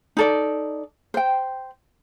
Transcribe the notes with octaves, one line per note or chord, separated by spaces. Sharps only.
D#4 A4 D5
C5 G5